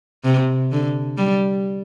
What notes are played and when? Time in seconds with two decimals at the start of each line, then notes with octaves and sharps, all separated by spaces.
0.24 C3
0.72 D3
1.18 G3